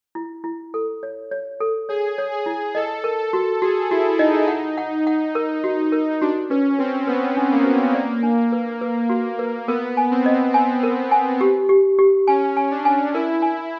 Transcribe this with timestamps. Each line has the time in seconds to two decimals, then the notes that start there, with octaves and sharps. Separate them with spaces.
0.15 E4
0.44 E4
0.74 A4
1.03 C#5
1.31 C#5
1.60 A4
1.89 G#4 C#5
2.18 C#5
2.32 G#4
2.46 E4
2.75 A4 D#5
3.04 A#4
3.18 A4
3.33 F#4
3.62 F#4 G#4
3.91 E4 F#4
4.19 D#4 D#5
4.48 F#5
4.78 F#5
5.07 F#5
5.35 A#4
5.64 F#4
5.92 A#4
6.22 D4 F#4
6.50 C#4 B4
6.79 C4 B4
7.08 B3 B4
7.37 D4
7.52 A#3
7.65 F#4
7.94 A#3 D5
8.23 D4
8.52 B4
8.81 B4
9.09 F#4
9.39 B4
9.68 B3 A#4
9.97 G#5
10.11 C4
10.26 D#5
10.54 C4 G#5
10.83 A#4
11.11 G#5
11.41 G4
11.69 G4
11.99 G4
12.27 C#4 G#5
12.57 G#5
12.71 D4
12.85 G#5
13.14 E4 A#4
13.42 G#5